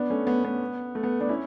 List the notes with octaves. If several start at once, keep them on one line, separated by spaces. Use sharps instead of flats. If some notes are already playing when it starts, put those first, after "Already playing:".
Already playing: B3 D4
A3 C#4
B3
B3
A3
B3
B3 D4
C#4 E4